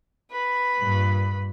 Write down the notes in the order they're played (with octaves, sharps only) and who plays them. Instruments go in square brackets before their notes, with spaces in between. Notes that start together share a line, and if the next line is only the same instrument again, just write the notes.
[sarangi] B4
[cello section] G2 A#2